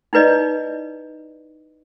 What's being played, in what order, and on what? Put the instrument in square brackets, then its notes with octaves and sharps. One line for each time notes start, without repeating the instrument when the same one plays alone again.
[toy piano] D#4 E4 B4 D5 D#5